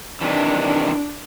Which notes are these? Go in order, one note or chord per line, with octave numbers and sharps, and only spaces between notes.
C3 D#3 E3 D4